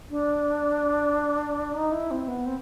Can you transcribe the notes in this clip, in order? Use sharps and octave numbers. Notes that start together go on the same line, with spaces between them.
D4
D#4
E4
C4
B3
C4